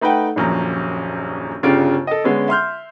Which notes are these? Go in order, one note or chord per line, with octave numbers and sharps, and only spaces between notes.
A3 D#4 B4 F#5 G5
D#1 A#1 F#2 A#5
G1 C#3 D4 F4 G4 D7
A4 D#5
D3 G#3 B3 C#4
E5 C6 F6 G6